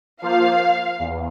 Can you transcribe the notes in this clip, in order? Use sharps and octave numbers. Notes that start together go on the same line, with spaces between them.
F3 A#3 F4 C5 F5
E2